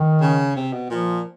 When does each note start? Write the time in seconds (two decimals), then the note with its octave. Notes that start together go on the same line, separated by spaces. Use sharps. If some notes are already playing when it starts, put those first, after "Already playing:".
Already playing: D#3
0.21 C#3
0.56 C3
0.73 B2
0.90 A#2 F3